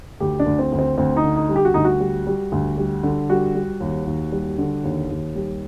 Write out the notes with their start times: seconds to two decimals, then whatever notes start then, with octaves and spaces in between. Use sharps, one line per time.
0.20 D2 G4
0.40 D4
0.46 D2
0.59 C4
0.72 D2
0.79 C4
0.98 D2 C4
1.17 D#4
1.24 D3
1.36 D#4
1.49 G3
1.56 G4
1.65 F#4
1.74 D2 D#4
1.85 F#4
2.00 G3
2.27 G3
2.52 D2
2.78 G3
3.03 D3
3.30 G3 F#4
3.55 G3
3.81 D#2
4.06 D#2
4.32 G3
4.58 D3
4.84 D#2
5.09 D#2
5.35 G3